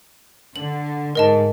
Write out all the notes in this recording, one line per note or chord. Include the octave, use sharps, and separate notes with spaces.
D3 F#7
G#2 A#4 D#5 A5